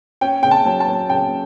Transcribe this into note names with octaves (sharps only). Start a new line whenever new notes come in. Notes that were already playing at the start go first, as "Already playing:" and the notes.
C#4 G5
C#3 G5
A5
F#3
A5
F#3
C#3 G5